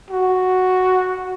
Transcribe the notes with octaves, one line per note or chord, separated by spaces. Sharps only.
F#4